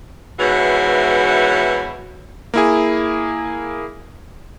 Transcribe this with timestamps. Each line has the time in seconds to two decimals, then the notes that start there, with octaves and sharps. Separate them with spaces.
0.38 G#2 B2 E3 E4 F#4 C#5
2.54 A#3 E4 G#4